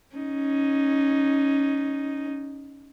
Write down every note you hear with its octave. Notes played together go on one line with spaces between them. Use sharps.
C#4 D#4